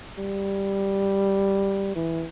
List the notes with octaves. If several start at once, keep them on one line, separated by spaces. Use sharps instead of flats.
G3
E3